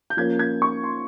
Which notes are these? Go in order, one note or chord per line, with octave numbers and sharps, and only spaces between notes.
G6
F3 A#3 C#4 G#6
G#6
C#6
C6